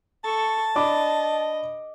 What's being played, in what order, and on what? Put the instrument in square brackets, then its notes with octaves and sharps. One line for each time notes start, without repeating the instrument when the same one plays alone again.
[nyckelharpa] A4 C#6 [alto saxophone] A5
[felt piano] D4 B5 D6 [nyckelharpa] D#5